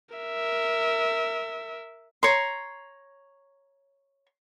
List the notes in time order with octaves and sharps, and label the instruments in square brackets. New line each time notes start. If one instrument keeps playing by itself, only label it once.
[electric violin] A#4 E5
[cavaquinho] C#5 A#5 C6